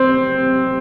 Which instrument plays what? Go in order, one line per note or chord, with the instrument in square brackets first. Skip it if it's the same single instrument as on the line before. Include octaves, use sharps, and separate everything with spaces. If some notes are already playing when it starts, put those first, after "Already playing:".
Already playing: [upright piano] C4